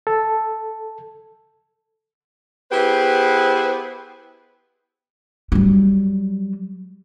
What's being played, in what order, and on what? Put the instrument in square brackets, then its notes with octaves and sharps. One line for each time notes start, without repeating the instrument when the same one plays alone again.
[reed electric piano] A4
[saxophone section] B3 E4 G4 G#4 B4 C5
[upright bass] F#3 G3